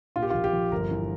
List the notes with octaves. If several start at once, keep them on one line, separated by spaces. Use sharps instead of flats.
A#2 F4
G4
A#1 F4
G4
F3
G1 A#4
E3